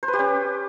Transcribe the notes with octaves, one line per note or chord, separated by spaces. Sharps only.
C5
B4
G4
C#4